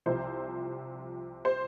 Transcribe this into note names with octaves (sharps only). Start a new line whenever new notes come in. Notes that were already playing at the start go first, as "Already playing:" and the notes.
C2 C3 F3 C5
C5